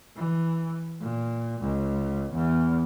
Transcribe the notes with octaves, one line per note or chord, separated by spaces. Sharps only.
E3
A#2
C#2
E2